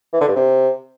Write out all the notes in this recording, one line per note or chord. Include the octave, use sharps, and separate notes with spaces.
E3
D3
G2
C3